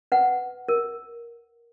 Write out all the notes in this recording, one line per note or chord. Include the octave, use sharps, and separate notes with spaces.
B4 F#5
A#4